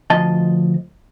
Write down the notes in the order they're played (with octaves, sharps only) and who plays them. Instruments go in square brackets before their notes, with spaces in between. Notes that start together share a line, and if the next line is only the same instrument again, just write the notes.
[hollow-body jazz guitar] D2 F3 D#5 A5